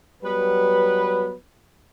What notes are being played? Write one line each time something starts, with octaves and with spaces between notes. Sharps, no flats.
F#3 G3 B3 B4